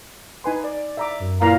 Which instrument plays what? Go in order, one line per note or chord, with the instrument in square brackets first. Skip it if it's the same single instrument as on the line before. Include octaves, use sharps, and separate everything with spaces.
[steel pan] D#4 G#5 C6 [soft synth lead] B4
[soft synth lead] D5
[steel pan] E5 A#5 D6
[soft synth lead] F#2
[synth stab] A#2 [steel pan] E4 F4 B4 [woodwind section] F5 A#5